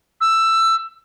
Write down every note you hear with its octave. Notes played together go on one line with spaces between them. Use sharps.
E6